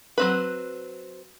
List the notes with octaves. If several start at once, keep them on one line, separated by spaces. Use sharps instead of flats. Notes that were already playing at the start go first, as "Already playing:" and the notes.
F#3 C4 B4